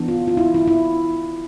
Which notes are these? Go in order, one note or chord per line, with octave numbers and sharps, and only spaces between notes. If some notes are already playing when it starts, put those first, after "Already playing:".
Already playing: E3 B3 D4
F4
F4
E4
E4
E4